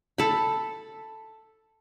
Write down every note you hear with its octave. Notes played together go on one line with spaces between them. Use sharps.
A4 B5